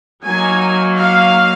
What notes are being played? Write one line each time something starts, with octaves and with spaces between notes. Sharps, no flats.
F#3 A#3 D#4 G#5
F5